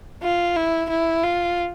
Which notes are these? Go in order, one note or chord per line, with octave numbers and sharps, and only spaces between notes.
F4
E4
E4
F4